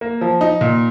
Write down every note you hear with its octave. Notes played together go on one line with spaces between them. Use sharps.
A#3
F3
D#4
A#2